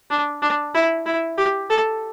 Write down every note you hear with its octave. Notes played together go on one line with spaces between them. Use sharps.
D4
D4
E4
E4
G4
A4